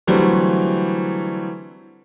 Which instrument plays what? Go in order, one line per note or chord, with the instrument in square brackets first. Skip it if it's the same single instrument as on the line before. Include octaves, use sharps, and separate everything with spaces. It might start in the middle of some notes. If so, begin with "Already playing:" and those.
[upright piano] D3 E3 F#3 G3 A3 C4